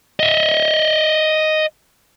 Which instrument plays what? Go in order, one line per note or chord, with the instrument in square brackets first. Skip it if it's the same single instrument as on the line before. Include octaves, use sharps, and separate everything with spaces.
[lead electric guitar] D#5 E5